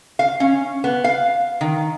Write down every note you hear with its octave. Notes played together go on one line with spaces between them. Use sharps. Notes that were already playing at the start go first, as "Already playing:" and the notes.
F5
C#4
B3
F5
D#3